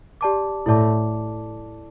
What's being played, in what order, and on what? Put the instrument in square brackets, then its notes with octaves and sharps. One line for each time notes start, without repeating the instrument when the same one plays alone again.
[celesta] G4 D5 A5 D6
[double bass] A2 [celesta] E4 A4 D5 A5 D6